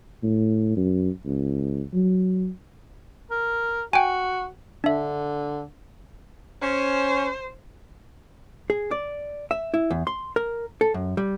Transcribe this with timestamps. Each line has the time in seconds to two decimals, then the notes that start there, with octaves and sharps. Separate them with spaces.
0.23 A2
0.77 F#2
1.26 C#2
1.93 F#3
3.31 A#4
3.93 F#4 G5 G#5
4.84 D3 D4 E5
6.62 C#4 C5
8.70 G#4
8.91 D5
9.51 E5
9.74 E4
9.90 E2
10.07 C6
10.36 A#4
10.81 A4
10.94 F#2
11.17 G3